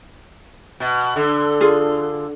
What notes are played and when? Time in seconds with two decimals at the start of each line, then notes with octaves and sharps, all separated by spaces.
0.80 B2
1.16 D3 A4
1.61 F4 G#4